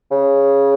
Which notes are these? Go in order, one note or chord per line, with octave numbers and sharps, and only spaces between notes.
C#3